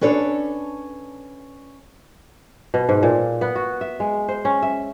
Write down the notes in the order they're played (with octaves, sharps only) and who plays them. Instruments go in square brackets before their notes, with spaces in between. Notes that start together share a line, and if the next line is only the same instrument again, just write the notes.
[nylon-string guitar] C#4 D4 A4 B4 C#5
[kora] B2
G#2
A#2
B3
F#4
E5
G#3
C5
C#4
E5